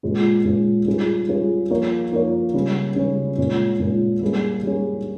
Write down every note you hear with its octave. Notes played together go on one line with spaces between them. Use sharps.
A#2 G#3 C#4 F4
A#2 G#3 C#4 F4
G3 C#4 F4 G#4
G3 C#4 F4 G#4
F3 A#3 F4 A#4 C#5
F3 A#3 F4 A#4 C#5
C#3 G3 C#4
C#3 G3 C#4
A#2 G#3 C#4
A#2 G#3 C#4
G3 A#3 C#4 G#4
G3 A#3 C#4 G#4